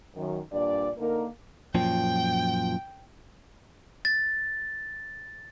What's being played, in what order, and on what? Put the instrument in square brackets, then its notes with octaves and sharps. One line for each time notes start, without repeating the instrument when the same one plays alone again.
[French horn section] F#2 D#3
G2 A#2 D4 D5
D3 A#3 D#4 A#4
[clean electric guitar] F#2 A#2 F3 [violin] G5
[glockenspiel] A6